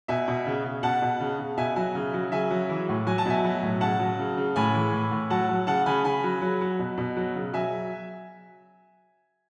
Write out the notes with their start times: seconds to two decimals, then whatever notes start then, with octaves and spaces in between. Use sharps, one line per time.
0.08 B2 E5 G#5
0.28 B2
0.46 C#3
0.64 C#3
0.83 B2 F#5 A5
1.02 B2
1.20 C#3
1.39 C#3
1.58 B2 E5 G#5
1.76 F#3 E5 G#5
1.95 C#3
2.13 F#3
2.32 C#3 E5 G#5
2.51 F#3
2.69 E3
2.89 A2
3.06 F#3 G#5
3.18 A5
3.26 B2 E5 G#5
3.44 F#3
3.63 A2
3.81 C#3 F#5 A5
4.00 F#3
4.18 C#3
4.37 C#3
4.56 A2 G#5 B5
4.74 E3
4.93 A2
5.11 A2
5.30 F#3 F#5 A5
5.49 F#3
5.67 C#3 F#5 A5
5.86 C#3 G#5 B5
6.04 C#3 G#5 B5
6.24 F#3
6.41 F#3
6.61 F#3
6.79 B2
6.98 B2
7.17 F#3
7.35 C#3
7.53 F#3 E5 G#5